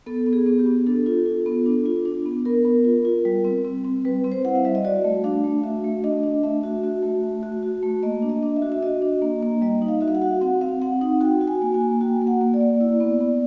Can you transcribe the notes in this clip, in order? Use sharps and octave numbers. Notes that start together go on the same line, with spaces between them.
B3 A4
B3
G#4
B3
G4
B3
D4 A4
F4
F4
B3
D4
F4
D4
B3
B3 A#4
B3
F4
F4
G3
C4
C4
C4
G3 B4
C4
C5
E4 F#5
F5
G3 E5
D#5
F#4 D5
A3
D4 F5
A3
F#4 E5
A3
D4 D#5
D4
A3 E5
F#4
F#4
A3
A3
F#4
F#4
A3
A#3 D#5
D4
D#5
D4
E5
F#4
E5
F#4 D#5
D4
A#3
A#3
G3 D#5
D#4
F5
F#4 E5
F5
F#5
F#4
C4 F#5
C4 F5
C4 F#5
D#4 F#5
F#4 G5
F#4
G#5
A#3
G#5
A#3
F#4 G5
A#3
F#5
A#3
D5
A#3
E4
B3
B3